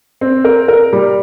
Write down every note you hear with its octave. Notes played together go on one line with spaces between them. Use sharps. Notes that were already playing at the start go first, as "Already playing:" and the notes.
C4
A#4
A#4
G3